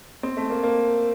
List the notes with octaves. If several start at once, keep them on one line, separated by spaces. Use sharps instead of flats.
C4
A3
A#3
A#3